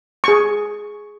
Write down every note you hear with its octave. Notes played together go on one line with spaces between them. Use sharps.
G#4 C#6